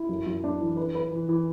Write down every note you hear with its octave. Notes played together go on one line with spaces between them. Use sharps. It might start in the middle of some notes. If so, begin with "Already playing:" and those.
Already playing: E4
F#2
F#2
D4
E3
B4
B4
E3
E3